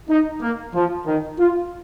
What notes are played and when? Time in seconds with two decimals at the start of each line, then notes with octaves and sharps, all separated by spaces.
0.09 D#4
0.42 A#3
0.74 F3
1.07 D#3
1.39 F4